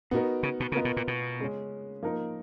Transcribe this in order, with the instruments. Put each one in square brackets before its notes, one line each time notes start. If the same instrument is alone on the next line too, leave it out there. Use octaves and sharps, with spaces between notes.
[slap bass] A#2 [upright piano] B3 D#4 F#4 A#4
[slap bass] C#3
B2
[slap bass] C#3 [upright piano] B3 F4 A#4 D#5
[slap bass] B2
A#2
B2
[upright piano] C#3 G#3 C#4
F3 A#3 D#4 A#4